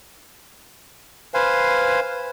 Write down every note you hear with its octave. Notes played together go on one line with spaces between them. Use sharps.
B4 C5 F5 G#5